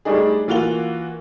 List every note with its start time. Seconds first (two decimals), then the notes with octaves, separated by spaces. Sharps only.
0.05 G3 A3 D4 D#4 G#4
0.48 E3 A#3 F4 F#4 F7 G7